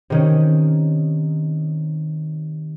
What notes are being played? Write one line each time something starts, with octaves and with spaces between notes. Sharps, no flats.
C3 D#3 C#4